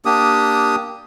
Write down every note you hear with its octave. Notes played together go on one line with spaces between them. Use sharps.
A#3 D4 G4 D#6